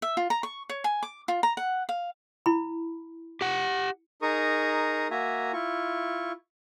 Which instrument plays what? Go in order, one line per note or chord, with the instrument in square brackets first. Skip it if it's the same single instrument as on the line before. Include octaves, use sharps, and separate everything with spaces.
[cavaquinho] E5
F4
A#5
C#6
C#5
G#5
D6
F4
A#5
F#5
F5
[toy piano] E4 B5
[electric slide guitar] G4 F#5
[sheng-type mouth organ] D#4 G#4 A#4 A#5 C#6 D#6
A#3 F#4 E5 G#5 A#5
E4 F4 C#6